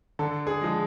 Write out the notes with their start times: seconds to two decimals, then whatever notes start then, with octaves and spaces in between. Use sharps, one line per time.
0.19 D3 A4
0.47 G#4
0.61 F3 G#3